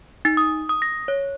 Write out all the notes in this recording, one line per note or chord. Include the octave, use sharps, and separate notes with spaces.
D#4
D#6
D#6
A#6
C#5